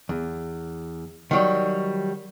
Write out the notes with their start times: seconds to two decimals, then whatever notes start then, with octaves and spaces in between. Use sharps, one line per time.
0.09 E2
1.31 D#3 F#3 G3